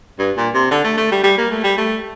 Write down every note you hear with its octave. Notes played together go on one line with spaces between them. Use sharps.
G2
A#2
C3
D3
A3
A3
G3
G3
A#3
A3
G3
A3